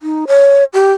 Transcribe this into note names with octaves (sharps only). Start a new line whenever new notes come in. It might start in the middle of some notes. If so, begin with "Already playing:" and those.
D#4
C#5
G4